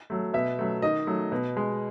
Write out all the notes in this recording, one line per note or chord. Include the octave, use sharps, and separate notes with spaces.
F#3 A3
B2 E5
F#3 A3
D#3 D#5
F#3 A3
B2
G#3